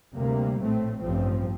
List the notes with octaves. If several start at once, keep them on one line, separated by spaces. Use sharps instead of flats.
D2 C3 G3 A#3
A#1 A2 A3 C4
A1 G2 F3 C4